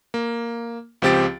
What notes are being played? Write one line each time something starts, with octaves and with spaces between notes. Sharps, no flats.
A#3
C#2 F3 C4 G4 A6 D7